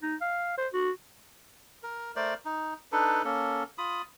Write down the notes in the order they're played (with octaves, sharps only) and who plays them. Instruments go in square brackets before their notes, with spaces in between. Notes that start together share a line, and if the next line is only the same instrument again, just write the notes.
[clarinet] D#4
F5
C5
F#4
[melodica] A#4
A3 A#4 C5 D5
D#4
D4 D#4 A4 B4
A#3 C#4 A4
F4 B5 D#6